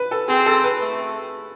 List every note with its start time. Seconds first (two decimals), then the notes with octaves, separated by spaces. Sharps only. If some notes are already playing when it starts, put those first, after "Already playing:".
Already playing: B4
0.11 A4
0.28 C4 G#4
0.46 A4
0.64 B4
0.81 A3